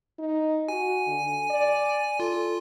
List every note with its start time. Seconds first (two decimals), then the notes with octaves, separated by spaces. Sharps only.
0.19 D#4
0.68 F#4 G#5
1.07 D3
1.50 D5
2.20 F4 A4